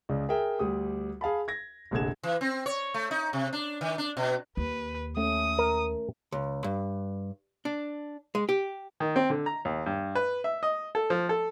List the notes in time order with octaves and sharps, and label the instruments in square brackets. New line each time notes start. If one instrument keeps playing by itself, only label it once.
[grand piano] C#2 C#3 D5
G#4 A#4 E5 G5
D2 G3 G4 D#6
G#4 F5 A5 B5
G#6 A#6
F1 A#1 D3 A4 G#6 E7
[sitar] E3
C4
C#5
A3
D#4
C3
D4
D#3
D4
B2
[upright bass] D#2 [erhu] B4
[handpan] A3 C#4 [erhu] D#6
[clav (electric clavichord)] A#4
[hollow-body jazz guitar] C#2
G2
D4
G#3
G4
[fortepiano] D#3
C4
D3
A#5
D#2
G2
B4
E5
D#5
A4
F3
A4